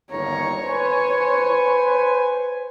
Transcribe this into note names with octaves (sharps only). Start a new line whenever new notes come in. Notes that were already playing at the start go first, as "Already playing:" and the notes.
G1 D#2 C#5 A#5
B4 C5 G#5